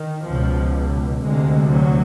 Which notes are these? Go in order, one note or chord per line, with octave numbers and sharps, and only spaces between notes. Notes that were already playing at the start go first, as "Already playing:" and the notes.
Already playing: D#3
C#2 B2 F3
D2 C3 G#3
F#3